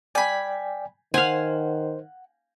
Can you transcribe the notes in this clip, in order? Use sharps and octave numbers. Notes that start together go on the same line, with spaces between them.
D5 G5 G#5 B5
D#3 C5 F5 F#5 G#5